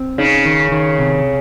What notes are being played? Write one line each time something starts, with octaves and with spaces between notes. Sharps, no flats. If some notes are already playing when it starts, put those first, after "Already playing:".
Already playing: C4
C#3 D#4
D#3
D#3
C3